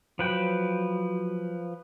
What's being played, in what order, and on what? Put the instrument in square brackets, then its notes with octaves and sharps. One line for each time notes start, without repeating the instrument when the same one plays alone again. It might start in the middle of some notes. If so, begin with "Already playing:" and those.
[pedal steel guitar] F3 B4 G5 [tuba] F#3